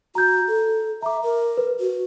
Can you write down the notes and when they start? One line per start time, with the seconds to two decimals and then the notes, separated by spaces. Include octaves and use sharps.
0.15 F#4 A#5 G6
0.48 A4
1.02 E5 A#5 D6
1.23 A#4
1.57 B4
1.80 F#4